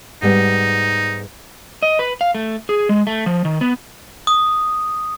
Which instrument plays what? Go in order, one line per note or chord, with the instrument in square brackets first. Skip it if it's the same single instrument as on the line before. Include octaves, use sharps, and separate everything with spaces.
[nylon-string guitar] G#2 G3 B3 [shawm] D#4
[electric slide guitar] D#5
B4
F5
A3
G#4
G#3
A3
F3
D#3
B3
[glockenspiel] D#6